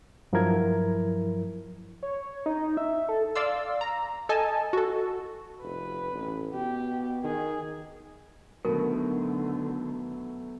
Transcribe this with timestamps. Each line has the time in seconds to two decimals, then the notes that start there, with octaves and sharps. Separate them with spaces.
0.33 G2 F3 F#3 E4 A#4 G#6
2.03 C#5
2.46 D#4
2.77 E5
3.09 A4
3.35 D5 F5 C6 E6
3.81 A#5
4.29 A4 D#5 G#5 A5
4.73 F#4 A4
5.62 F1 B4
6.14 A1
6.54 B2 G4
7.23 D#3 G#4
8.65 B2 D3 D#3 F#3 A3 A#4